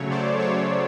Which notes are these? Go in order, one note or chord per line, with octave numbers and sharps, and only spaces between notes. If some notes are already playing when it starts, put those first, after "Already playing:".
Already playing: C#3 F#3 A3 C#5
C5 D5
C#5